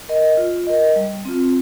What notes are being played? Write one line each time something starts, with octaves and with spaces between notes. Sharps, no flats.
A#4 D#5
F4
A#4 D#5
G3
C4 F4